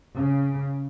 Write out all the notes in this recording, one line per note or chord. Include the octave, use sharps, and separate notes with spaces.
C#3